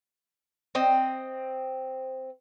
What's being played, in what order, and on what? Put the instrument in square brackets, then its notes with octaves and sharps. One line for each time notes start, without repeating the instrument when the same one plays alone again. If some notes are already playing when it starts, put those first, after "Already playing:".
[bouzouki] C4 D#5